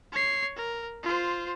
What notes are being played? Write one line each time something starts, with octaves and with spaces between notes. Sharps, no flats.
C#5 C7
A#4
F4 C5